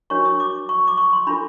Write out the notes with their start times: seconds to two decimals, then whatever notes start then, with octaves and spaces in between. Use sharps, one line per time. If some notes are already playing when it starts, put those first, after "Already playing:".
0.10 D4 F#4 A#4 C#5 C#6
0.25 D#6
0.40 D6
0.69 C#6
0.87 D6
0.98 C#6
1.13 C6
1.27 D4 F4 A4 B5